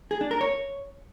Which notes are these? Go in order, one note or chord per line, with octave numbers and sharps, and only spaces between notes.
G#4
D4
A#4
C#5